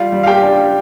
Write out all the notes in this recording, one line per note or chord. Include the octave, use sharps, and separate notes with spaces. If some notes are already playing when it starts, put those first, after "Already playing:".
Already playing: G3 F4 F5
G3
F5
G4 G5
D4